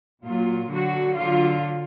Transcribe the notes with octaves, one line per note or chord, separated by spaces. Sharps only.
A#2 F#3 F4
D3 F#3 F#4
D3 F#3 F4